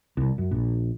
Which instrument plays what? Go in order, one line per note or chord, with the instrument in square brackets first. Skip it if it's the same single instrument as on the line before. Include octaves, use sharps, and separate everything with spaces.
[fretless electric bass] C2
F#2
A#1